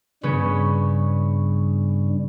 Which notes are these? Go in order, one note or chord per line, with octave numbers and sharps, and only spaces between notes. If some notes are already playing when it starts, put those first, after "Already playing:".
G2 C#3 G3 B3 C#4